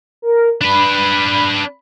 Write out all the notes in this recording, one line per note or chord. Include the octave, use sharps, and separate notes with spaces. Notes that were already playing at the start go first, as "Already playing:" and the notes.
A#4
D4 B4 B5